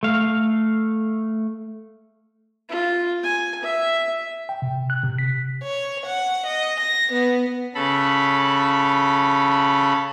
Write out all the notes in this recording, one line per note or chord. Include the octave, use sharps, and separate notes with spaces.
A3 F5
F4
G#5
E5
G5
C3
F#6
C3
B6
C#5
F#5
D#5
A#6
B3
C#3 A4 B5